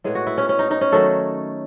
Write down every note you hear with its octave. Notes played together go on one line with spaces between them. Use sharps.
A2 G#3 B3 G#4
F#4
E4
C#4
C#4
D#4
D#4
C#4
D#3 F#3 A3 A4